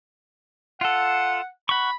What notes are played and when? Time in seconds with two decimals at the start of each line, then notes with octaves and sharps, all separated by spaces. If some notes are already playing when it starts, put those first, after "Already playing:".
0.81 F4 A4 F#5
1.69 F#5 B5 C#6